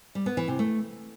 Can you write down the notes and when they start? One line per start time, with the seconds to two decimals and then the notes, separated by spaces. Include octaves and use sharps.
0.15 G3
0.26 B3
0.37 E3
0.48 C3
0.59 A3